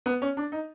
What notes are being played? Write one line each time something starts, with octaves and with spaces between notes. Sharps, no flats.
B3
C#4
D4
D#4